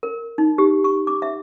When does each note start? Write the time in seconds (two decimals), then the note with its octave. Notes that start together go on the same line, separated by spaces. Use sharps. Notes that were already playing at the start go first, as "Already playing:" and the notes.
0.03 A#4
0.38 D#4
0.58 G4
0.84 C#6
1.07 D6
1.22 E5